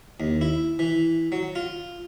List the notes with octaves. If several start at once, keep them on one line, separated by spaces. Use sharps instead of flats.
D#2
E4
E3
F#3
F4